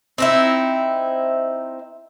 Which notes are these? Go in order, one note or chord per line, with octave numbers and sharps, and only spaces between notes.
C4 D#4 E4